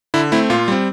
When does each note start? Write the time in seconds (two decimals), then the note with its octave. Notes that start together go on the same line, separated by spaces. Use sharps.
0.14 D3 E4
0.32 A3 C4 E4
0.50 A#2 F4
0.68 G3 C4